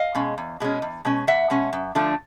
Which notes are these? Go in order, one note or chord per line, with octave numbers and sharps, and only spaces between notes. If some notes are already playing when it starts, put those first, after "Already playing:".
Already playing: D#5 F5
B2 G#3 C#4
E2
B2 G#3 C#4
E2
B2 G#3 C#4
E2 E5 F#5
B2 G#3 C#4
F#2
D3 F3 A3 D4